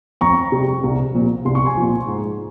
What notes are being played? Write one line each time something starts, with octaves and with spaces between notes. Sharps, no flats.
F2 A#5 C#6
C3 G3
C2
A#2 F3
C2 C6
C#6
G#5 C6
A#2 F3
G#2